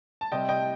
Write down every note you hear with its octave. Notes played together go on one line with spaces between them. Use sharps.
A5
C3 G3 C4 D#5 G5
D#5 G5